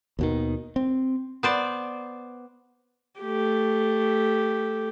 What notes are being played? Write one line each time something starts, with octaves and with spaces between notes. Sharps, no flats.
D#2 B2 D#3
C4
B3 C5 D5
A3 G4